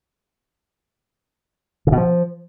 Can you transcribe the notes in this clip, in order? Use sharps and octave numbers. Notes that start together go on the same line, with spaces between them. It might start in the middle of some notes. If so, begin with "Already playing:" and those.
C#3
B2
F3